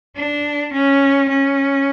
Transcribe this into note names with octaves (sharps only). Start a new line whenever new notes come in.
D4
C#4
C#4